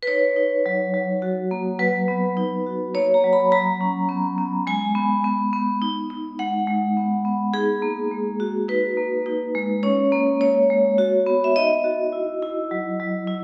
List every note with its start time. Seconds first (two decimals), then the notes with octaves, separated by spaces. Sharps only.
0.03 B4
0.07 D#4 C#5
0.36 D#4
0.66 F#3
0.94 F#3
1.22 F#4
1.51 A#3
1.79 F#3 B4
2.08 B3
2.37 D#4
2.67 F#4
2.94 A#3 C#5
3.14 A#5
3.24 F#3
3.33 B5
3.52 F#3 A#5
3.81 C#4
4.09 B3
4.38 B3
4.67 G#3 G#5
4.95 B3
5.24 B3
5.53 B3
5.82 D#4
6.10 D#4
6.39 G#3 F#5
6.67 G#3
6.97 B3
7.25 B3
7.54 D#4 G#4
7.82 A#3
8.12 G#3
8.40 F#4
8.68 D#4 B4
8.97 A#3
9.26 D#4
9.55 G#3
9.83 C#4 C#5
10.12 A#3
10.41 G#3 C#5
10.70 G#3
10.98 F#4
11.26 B3
11.44 E5
11.56 D#4 D#5
11.84 F#4
12.12 E4
12.42 E4
12.71 F#3
13.00 F#3
13.27 E4